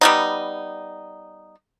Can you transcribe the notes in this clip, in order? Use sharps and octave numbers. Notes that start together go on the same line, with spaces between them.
G3 B3 D#4